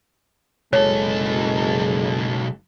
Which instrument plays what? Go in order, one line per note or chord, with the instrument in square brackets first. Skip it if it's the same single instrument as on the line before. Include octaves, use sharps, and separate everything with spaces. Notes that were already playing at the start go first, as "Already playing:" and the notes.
[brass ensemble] F#1 G#3 [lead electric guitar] B1 A4 [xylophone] C#5